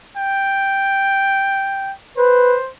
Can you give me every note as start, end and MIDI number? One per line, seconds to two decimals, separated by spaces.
0.17 1.92 79
2.17 2.56 71
2.17 2.70 72